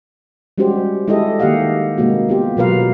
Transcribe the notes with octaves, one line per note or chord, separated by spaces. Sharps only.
G3 G#3 C#4 F#4 G4 C5
G#3 E4 G4 A4 D#5
D#3 A#3 G4 D#5 F5 F#5
C3 G#3 A#3 F#4
B3 F4 G4
B2 F#3 F4 A#4 B4 F5